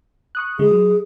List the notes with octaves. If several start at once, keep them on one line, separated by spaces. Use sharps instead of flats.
C#6 D#6 F#6
D3 G#3 G#4
F#3